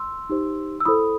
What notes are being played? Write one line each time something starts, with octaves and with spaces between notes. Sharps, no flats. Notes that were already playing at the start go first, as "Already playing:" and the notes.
Already playing: C6 E6
D#4 G4 C5
E6
E4 A4 C5 B5 D#6